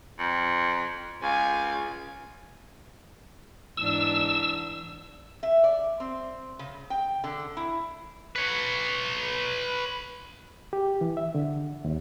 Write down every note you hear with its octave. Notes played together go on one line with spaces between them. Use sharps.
F2
C#2 F5 G#5
E2 G#2 D4 E6
E5
D5
C4
C#3
G5
D3
E4
B4 C#5
G4
E3
E5
D3
D#2